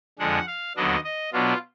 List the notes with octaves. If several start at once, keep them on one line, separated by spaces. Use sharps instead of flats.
F2 D3 G#3 D4 F#5
F5
D#2 D3 F#3 B3 D4 D#5
D#5
B2 F#3 B3 D4 F4